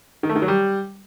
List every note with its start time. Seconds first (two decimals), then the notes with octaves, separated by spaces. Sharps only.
0.23 D#3
0.29 A3
0.36 D#3
0.42 F#3
0.48 G3